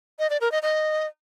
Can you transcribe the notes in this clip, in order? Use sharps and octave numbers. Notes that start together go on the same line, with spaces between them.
D#5
D5
A#4
D#5
D#5